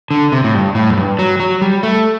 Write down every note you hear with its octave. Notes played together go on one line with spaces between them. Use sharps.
D3
C3
A2
G2
A2
F#2
G2
F#3
F#3
G3
A3